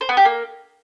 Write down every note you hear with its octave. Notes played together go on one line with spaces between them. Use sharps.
C5
B3
G4
A#3